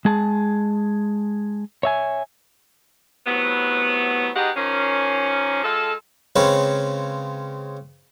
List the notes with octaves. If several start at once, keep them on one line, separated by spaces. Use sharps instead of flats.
G#3 G#4 A5
C#5 E5 G#5
A2 C3 F#3 B3
B2 G#3 D#4 G4 F#5
D#3 F3 A#3 C#4
G#3 F4 A4
C#3 G#3 C4 C#4 B4